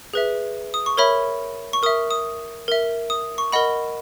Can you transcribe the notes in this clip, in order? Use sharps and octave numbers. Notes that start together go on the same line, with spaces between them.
G#4 B4 E5
D#6
C#6
A#4 C#5 E5 B5
C#6
A#4 E5 D#6
D#6
A#4 E5
D#6
C#6
A#4 D#5 F#5 B5